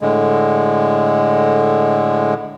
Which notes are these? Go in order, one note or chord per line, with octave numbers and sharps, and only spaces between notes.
A2 D3 G#3